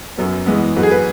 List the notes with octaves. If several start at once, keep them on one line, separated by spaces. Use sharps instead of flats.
F#2 F#3 B3
E2 E3 G#3 B3
G#2 F#3 B3 B4
G#4
B4